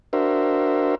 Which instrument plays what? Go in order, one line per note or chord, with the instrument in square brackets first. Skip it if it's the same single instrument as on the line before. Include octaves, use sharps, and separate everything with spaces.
[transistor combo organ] D4 F#4 A#4 C5 E5